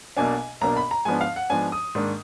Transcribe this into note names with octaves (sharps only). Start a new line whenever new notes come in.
B1 B2 A#3 D4 G#5
B1 B2 A#3 D4 A#5
B5
A#5
G#2 F3 B3 D4 G#5
F5
F#5
G#2 F3 B3 D4 G#5
D#6
G#2 D#3 A#3 D4